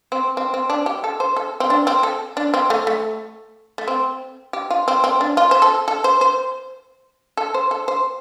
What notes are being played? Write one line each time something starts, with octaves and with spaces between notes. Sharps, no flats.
C4
C4
C4
D4
G4
A4
C5
A4
C4
D4
C4
A4
D4
C4
A3
A3
A3
C4
G4
F4
C4
C4
D4
F4
C5
A4
A4
C5
C5
A4
C5
A4
C5